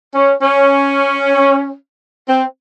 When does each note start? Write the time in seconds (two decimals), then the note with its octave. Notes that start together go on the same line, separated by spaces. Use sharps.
0.14 C#4
0.42 C#4
2.29 C4